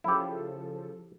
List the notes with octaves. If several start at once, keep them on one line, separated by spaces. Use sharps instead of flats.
C#3 F3 E4 G4 A4